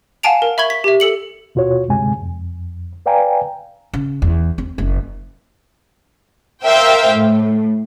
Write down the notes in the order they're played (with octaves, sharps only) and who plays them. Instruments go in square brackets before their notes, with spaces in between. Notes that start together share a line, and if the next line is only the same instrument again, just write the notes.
[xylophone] F5 F#5 G#5 A5 D7 F7
A#4
E5 B5 C#6 G#6 G7
B6
G4 E5
A4 C#7 F#7
[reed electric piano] D#2 B2 F4 F#4 C#5
D2 G2 C3 G#3 G#5
F2
B4 D5 F5 G5 G#5 A#5
[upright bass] C#3
E2
C4
F#1
[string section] A#4 C5 E5 F5 G5
A2